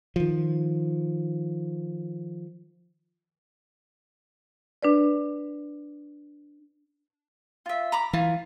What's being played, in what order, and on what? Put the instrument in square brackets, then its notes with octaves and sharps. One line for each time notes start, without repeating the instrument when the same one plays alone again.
[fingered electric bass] D#3 F3
[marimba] D4 B4 D5
[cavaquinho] F4 E5
A#5 B5 D6
[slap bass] E3 [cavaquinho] F4